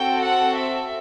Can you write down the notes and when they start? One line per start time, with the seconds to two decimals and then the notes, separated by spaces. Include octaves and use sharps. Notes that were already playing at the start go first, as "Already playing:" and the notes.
Already playing: C4 F#4 A4 G5
0.24 F#5
0.58 E5